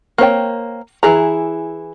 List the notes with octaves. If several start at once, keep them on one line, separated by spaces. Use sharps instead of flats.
A#3 C4 C#5 G5
E3 E4 G#4 A#5